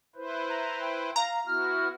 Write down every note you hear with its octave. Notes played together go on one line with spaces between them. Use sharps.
E4 B4 C5
A#5
G5
F5 A#5
B3 E4 F#4 F6